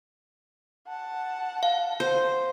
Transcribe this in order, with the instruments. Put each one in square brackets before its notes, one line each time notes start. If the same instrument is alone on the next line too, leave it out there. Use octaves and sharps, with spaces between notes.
[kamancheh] F#5 A5
[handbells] F5
[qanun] C5